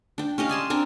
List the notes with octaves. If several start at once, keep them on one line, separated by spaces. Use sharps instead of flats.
D4 G5
C#4 G4 D#5 F5
D5 G#5 A5 C6
C4 D4 A#4